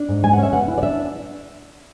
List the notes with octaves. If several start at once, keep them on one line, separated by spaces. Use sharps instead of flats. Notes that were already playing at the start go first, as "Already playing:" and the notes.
Already playing: D4
G#2
G#3 G#5
F#5
C#4
E5
B3 F#5
E4
D5
D4 E5